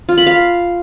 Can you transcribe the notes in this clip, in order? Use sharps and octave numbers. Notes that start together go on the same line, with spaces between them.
F4
B5
F5